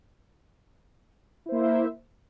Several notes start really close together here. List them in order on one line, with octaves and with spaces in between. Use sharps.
E4 C5 A#3 E5